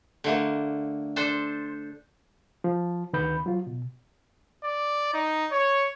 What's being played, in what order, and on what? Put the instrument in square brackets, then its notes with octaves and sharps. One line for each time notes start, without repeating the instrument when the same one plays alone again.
[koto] D3 A3 A#3
D4 A4 C5
[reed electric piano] F3
D2 D#3 B4 B5 G6
F#3 F4
B2
[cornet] D5
D#4
C#5